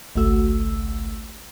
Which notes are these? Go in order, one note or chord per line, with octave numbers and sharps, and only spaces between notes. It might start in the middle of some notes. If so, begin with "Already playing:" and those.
G#1 C#2 A3 F#4 E6